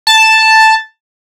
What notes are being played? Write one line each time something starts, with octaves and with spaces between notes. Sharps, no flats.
A5